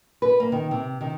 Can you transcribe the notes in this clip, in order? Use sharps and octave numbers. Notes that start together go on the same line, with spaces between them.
B4
A#3
D#3
C3
D#3